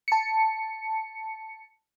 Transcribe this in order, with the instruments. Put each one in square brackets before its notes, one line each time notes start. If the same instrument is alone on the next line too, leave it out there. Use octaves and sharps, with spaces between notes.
[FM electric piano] A5 C#7